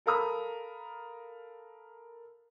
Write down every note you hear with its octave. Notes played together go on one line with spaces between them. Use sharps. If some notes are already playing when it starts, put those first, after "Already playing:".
A4 A#4 F5 A#5 B5 D#6